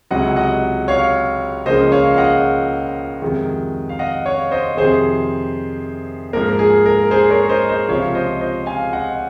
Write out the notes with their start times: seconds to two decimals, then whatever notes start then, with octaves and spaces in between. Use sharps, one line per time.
0.11 C#2 C3 F#3 D#5 F#5
0.36 D#5 F#5
0.88 C#5 F5
1.66 C#2 C#3 F3 A#3 C5 D#5
1.92 C#5 F5
2.14 F5
2.18 D#5 F#5
3.22 F2 C3 D#3 G#3
3.89 F5
3.99 D#5 F#5
4.26 C#5 F5
4.51 C5 D#5
4.77 F2 C3 D#3 G#4 C5
6.33 G#2 F3 A#3 A#4
6.59 G#4
6.86 A#4
7.11 G#4 C5
7.30 A#4 C#5
7.49 C5 D#5
7.69 C5 D#5
7.88 C#2 C3 F3 C#5 F5
8.15 C5 D#5
8.40 C5 D#5
8.66 F5 G#5
8.93 D#5 F#5